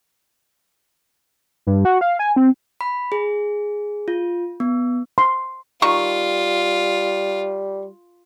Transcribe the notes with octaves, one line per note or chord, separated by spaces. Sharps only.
G2
F#4
F5
G#5
C4
B5
G#4
F4
B3
C6
D#3 G3 F4 C#6